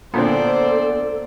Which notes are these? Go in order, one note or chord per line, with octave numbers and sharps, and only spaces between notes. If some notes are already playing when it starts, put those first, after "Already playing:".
A#2 D3 B3 C4 A4 C5 D5